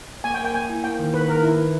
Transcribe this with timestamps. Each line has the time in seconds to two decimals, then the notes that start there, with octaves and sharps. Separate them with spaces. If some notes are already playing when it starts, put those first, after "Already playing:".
0.24 A#3 G#5
0.34 G5
0.39 A#4
0.45 G5
0.54 A#3 G#5
0.70 E4
0.84 A#3 G5
0.99 D#3
1.14 D#3 B4
1.29 D#3 A#4
1.43 E4 B4
1.58 B4